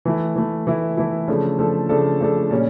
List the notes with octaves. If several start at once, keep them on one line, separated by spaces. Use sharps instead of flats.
E3 A3 E4
E3 A3 E4
E3 A3 E4
E3 A3 E4
C#3 F3 A3 D4 A4
C#3 F3 A3 D4 A4
C#3 F3 A3 D4 A4
C#3 F3 A3 D4 A4
A#2 G3 C#4